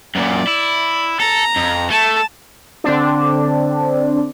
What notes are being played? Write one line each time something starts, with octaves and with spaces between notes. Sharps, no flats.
F#2 A#2 D5
E4
A4 A#5
F2
A3 A5
D3 C4 D4